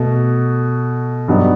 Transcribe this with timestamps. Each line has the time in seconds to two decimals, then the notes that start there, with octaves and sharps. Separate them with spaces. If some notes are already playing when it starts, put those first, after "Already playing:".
Already playing: B2 A3 F#4
1.28 G2 F#3 B3 D#4